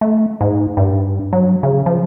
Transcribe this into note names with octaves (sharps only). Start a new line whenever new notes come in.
A3
G#2
G2
F#3
C#3
F3